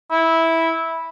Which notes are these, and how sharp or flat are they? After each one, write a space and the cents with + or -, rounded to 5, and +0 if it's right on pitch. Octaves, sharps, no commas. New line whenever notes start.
E4 -10